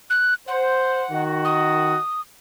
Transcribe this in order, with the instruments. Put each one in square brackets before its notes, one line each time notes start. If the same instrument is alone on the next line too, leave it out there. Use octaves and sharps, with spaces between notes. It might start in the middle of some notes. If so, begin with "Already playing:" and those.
[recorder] F#6
[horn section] C5 [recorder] F#5
[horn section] D#3 F#4
[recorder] D#6